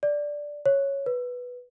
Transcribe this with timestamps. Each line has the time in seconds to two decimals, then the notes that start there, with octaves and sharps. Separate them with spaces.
0.03 D5
0.66 C#5
1.06 B4